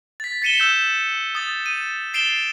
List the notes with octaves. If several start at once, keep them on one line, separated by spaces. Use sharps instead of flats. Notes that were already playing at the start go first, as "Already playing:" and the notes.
A6 B6
A6 B6 C#7 D#7 E7 G7
E6 G6 E7 G7
D#6 A6
D#7
A6 C7 D7 E7 F7 G7